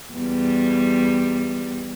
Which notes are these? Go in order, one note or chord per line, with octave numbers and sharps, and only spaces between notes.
E2 G3